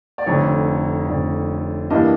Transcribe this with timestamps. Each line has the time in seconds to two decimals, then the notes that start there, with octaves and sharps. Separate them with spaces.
0.18 D5
0.26 F1 F2 D3 C#5
1.08 F1 F2 D3 D5
1.90 G2 E3 G3 A#3 D4 D#5